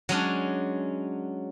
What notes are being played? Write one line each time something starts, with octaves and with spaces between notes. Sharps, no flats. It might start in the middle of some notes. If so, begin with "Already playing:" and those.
F#3 G#3 C#4 D4